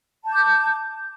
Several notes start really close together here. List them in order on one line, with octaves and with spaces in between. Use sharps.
A5 G6 D6